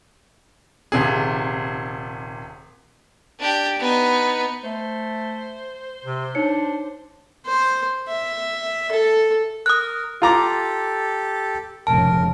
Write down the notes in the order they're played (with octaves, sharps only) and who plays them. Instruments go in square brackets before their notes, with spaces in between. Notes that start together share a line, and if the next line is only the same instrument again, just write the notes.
[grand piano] D#1 C3 G#4
[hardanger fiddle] D4 G4
B3 D#4
[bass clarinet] A3 [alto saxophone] C5
[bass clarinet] C3
[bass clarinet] D4 [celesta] D#4 C#5 C#7
[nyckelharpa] C5
E5
A4
[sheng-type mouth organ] A#4 [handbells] D#6 F#6
[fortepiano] F4 A#5 D6 [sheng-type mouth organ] G4 A4
[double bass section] F1 G#2 C#3 [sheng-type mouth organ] A#4 [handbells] A5